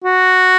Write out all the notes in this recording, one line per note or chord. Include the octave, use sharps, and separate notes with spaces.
F#4